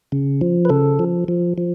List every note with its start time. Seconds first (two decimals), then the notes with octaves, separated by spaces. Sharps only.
0.12 C#3
0.41 F3
0.65 B4
0.70 C#3 A4
0.99 F3
1.28 F3
1.58 F3